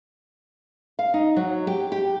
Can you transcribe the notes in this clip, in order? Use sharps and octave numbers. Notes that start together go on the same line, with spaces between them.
F5
D#4
F#3
G4
G4